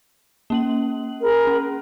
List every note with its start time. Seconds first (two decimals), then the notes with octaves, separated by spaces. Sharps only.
0.50 A#3 C#4 F#7
1.22 G#4 A#4 B5
1.47 C#4